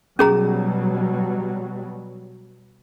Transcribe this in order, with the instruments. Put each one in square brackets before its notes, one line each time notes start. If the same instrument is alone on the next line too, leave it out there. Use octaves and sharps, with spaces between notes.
[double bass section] B2 F#3 G3 [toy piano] C#4 G#4 A#5